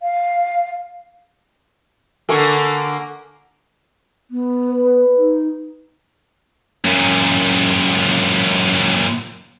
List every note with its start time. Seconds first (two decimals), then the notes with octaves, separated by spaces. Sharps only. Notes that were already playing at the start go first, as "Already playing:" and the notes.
0.01 F5
2.29 D3 A#3 A4 G#5 C#6
4.31 B3
4.71 B4
5.18 D#4
6.84 F#2 A#2